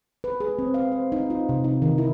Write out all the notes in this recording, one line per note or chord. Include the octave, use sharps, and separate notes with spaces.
B4
G#4
C4
F5
C5
D#4
F4
C3
D#4
D#3
E4